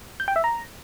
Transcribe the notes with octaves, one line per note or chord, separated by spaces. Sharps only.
G6
G5
E5
A#5